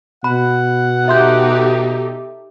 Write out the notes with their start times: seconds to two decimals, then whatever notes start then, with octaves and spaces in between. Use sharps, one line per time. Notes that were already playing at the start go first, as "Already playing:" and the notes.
0.24 B2 F#5 B5
1.08 D#4 G4 A4 E5 C6 G6